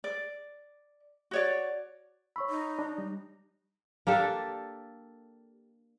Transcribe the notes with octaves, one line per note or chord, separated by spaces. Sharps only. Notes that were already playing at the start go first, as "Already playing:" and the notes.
D5
F#4 C#5 D5
C#5 B5 C#6 E6
D#4
D4
G3
A#3 D4 G4 A4